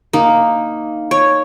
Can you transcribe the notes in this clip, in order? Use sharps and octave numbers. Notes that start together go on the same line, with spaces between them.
A#3 D#4
C#5